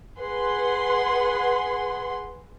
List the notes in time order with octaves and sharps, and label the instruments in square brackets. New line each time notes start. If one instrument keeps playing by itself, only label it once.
[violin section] G#4 B4 F#5 C6